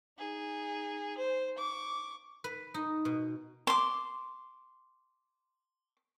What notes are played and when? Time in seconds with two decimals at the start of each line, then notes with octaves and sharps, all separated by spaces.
0.18 D#4 G#4
1.18 C5
1.58 C#6 D6
2.44 B4
2.74 D#4
3.05 B2
3.67 C6 D6